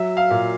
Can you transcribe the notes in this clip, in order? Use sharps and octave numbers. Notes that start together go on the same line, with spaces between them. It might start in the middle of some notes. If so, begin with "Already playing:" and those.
Already playing: F#3 E5
F5
A#2